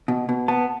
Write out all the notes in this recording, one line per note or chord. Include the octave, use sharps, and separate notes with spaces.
B2
B2
B3 A5